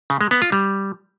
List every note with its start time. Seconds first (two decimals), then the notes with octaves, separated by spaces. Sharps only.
0.10 C#3
0.21 G#3
0.31 B3
0.42 F4
0.52 G3